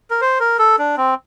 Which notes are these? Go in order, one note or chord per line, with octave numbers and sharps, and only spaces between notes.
A#4
C5
A#4
A4
D4
C4